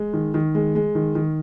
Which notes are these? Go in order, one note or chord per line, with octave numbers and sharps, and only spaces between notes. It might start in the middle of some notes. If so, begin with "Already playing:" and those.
Already playing: G#3
D#3
D#3
G#3
G#3
D#3
D#3